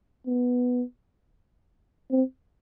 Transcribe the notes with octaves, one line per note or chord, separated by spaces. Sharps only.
B3
C4